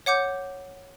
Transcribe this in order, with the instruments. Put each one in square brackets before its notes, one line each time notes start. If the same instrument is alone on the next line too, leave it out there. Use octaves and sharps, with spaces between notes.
[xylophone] C#5 F#5 D6 G6